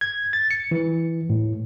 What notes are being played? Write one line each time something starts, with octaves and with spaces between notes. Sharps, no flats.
G#6
A6
C#7
E3
A2